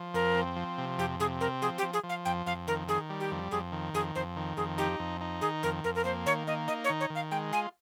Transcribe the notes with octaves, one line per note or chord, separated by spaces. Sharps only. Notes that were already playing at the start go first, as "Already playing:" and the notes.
Already playing: F3
F2 A#4
C4
F3
C3
F2 G4
C3 G#4
C4 A#4
F3 G#4
G4
F3
G#4
F3
F5
F2 G5
F2 F5
D#3 A#4
D#3 G#4
G3
G4
F2
F2 G#4
D#3
F2 G#4
F2 C5
D#3
F2 G#4
D#4 G4
F2
D#4
D#3 G#4
F2 A#4
F2 A#4
A#4
A#3 C5
D#3 C#5
A#3 D#5
D#4 D#5
C#5
D#3
C#5
D#3
F5
G#3 G5
F4 G#5